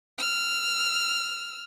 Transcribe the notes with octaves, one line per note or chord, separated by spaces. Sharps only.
E6 F6